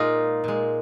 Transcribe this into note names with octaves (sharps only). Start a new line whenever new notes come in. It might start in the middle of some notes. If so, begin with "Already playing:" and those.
Already playing: A#2 G#3 D#4 F4
A#2 G#3